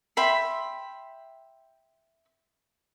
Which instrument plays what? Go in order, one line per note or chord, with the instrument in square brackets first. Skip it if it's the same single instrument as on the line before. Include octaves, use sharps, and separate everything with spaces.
[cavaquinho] E5 G5 B5 C6